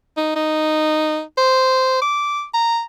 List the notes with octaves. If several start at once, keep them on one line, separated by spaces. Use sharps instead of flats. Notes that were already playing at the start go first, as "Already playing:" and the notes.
D#4
D#4
C5
D6
A#5